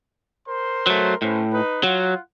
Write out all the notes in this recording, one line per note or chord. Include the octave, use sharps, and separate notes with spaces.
A#4 C5 C6
F#3 A3
A2 C#4 B4 C5
D#4 B4
F#3 F4 F#5